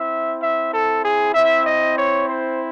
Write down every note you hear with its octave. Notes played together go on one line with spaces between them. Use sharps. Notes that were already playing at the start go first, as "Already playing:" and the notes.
Already playing: C4 E4 E5
E5
A4
G#4
C4 E4 E5
D#5
C#5
C5